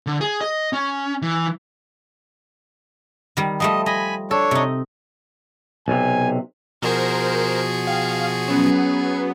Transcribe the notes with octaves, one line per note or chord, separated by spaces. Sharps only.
D3
G#4
D#5
C#4
E3
D#3 G3 D5
F3 G3 A3 D#5
D#5 G#5 B5
D4 A4 C#5
C3 D#4
B1 C3 G#5
B2 F3 F#4 G#4 A#4 C5
F5 G5
F#3 B3 C#4